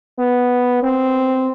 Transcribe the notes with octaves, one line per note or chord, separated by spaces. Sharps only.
B3
C4